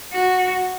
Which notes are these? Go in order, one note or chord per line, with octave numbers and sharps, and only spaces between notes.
F#4